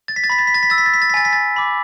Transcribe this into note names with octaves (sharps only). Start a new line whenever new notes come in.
A6
B6
A6
B5 B6
A6
B6
A6
B6
E6 A6
B6
A6
B6
A6
B6
G#5 A6
B6
A6
B5 D6